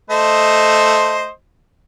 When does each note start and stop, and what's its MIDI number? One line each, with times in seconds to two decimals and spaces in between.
0.10 1.28 57
0.10 1.28 72
0.10 1.28 75